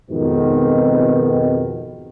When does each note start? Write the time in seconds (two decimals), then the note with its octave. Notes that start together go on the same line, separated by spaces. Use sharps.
0.11 F2 G#2 B2 D#3